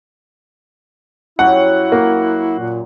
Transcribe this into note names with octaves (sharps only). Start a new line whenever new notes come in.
F#2 F#3 E4 G4 F#5
A#3
A#2